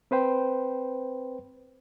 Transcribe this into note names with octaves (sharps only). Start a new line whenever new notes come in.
C4 B4 C5 G5